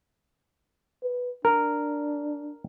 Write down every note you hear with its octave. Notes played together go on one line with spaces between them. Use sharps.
B4
D4 A#4